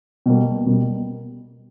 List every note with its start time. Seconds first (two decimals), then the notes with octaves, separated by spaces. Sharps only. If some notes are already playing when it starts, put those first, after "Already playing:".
0.26 B2 G3 A#3
0.66 B2 G3 A#3